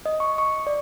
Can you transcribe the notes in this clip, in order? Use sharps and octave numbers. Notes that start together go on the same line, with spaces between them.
D#5
C#6
C#6
D5